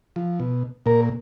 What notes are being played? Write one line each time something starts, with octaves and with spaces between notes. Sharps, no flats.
F3
B2
A#2 A#4